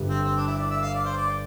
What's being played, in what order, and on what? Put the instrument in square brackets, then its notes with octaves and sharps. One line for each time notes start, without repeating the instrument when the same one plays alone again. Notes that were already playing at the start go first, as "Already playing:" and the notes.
Already playing: [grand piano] G1 G2 D3 G3
[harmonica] C4
C4
D4
E4
D5
E5
F5
D5
C5
D5